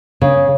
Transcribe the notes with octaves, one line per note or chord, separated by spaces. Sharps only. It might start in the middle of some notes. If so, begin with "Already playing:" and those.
C#3